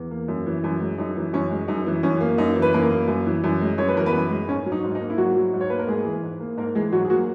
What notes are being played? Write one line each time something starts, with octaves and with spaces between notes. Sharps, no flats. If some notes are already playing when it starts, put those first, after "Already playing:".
Already playing: E2
A#3
F#2
E3
F#2
G#3
F#2 D#4
E3
F#2 C#4
G#3
F#2 D#4
E3
F#2 C#4
A#3
F#2 D#4
E3
B4
F#2 A#3 A#4
A#3
F#2
E3
F#2
G#3
F#2 C#5
B4
E3 A#4
B3 B4
F#2
G#3
G#2 C#4
F#3
D#4
G#2
D#4
A#3
E4
G#2 F#3 F#4
F#3
G#2
C#5
A#3 B4
A#4
G#2 G#3 G#4
E3
G#2
A#3
G#2 A#3 A#4
E3 G#3 G#4
G#2 F#3 F#4
G#4
F#3 A#3 F#4